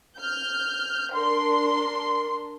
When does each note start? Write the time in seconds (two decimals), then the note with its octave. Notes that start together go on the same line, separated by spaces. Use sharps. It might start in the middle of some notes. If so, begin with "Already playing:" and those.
0.18 F6 G6
1.14 D4 A#4 C6